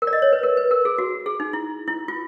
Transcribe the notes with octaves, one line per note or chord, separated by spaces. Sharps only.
A#4
D5
D#5
C#5
B4
A#4
B4
A#4
G#4
F#4
G#4
D#4
E4
E4
F4